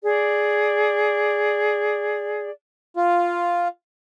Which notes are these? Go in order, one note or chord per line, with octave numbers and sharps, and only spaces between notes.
G#4 D5
F4